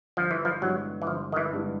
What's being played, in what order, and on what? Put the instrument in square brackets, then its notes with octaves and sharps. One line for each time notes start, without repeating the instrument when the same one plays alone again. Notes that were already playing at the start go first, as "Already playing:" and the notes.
[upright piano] G1 [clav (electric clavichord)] F3
[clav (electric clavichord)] E3
F3
[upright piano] G2 E3 G#3 B3 [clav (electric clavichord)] F#3
[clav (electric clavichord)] E3
[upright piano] G1 [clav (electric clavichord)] F3
[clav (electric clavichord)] D#3
E3
[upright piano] G2 E3 G#3 B3